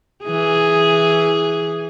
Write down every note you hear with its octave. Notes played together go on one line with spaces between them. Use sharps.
E3 G#4